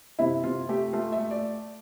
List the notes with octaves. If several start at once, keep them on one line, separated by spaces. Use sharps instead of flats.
C3 E4
C3 F4
A3 G4
A3 F4
E5
A3
D5